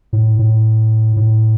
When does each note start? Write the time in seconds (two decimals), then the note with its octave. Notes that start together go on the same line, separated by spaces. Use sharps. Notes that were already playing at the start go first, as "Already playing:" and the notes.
0.13 A2
0.39 A2
1.17 A2